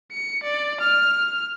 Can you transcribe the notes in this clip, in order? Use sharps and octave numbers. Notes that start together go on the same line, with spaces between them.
C#7
D5
F6